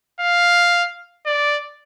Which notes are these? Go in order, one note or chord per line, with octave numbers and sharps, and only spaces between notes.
F5
D5